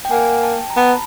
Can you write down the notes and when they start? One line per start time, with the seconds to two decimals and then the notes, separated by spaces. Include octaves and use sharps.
0.05 G5
0.11 A#3 F#5 G#5
0.43 G5 A5
0.70 A#5
0.77 B3 A5 B5